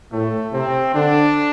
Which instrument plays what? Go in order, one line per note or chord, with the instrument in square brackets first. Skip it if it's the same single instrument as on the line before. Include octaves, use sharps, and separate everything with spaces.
[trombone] A2 [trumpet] A3
[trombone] C3 [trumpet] C4
[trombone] D3 [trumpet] D4